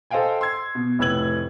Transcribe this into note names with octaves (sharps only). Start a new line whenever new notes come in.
A4 C5 D#5 F5 G5 G#5
C6 E6 G#6 C7
B2
F1 A2 B4 E6 G#6 F#7